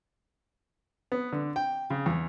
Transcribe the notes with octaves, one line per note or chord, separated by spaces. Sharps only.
B3
D3
G5
C#3
E2